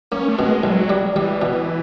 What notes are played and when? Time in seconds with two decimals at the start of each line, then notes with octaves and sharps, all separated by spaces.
0.12 A#3 C#4
0.29 A3
0.38 B2 G#3
0.64 B1 F#3
0.90 G3
1.15 E3 G3
1.42 B2